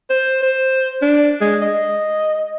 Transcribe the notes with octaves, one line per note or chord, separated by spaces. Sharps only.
C5
C5
D4
G#3
D#5